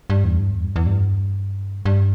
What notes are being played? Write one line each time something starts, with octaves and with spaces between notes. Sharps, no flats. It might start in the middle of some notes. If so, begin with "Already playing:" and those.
G2
E2
G2
E2
G2
E2
G2
G2